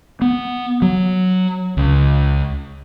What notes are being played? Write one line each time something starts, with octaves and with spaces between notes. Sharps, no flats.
B3
F#3
C#2